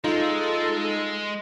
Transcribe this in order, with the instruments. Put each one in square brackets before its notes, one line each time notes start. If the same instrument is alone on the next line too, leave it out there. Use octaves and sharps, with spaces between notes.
[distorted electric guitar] G#3 [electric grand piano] D#4 F4 [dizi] A4